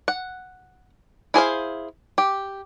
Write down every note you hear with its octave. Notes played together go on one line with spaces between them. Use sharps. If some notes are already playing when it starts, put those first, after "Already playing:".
F#5
E4 G#4 C5 F5
G4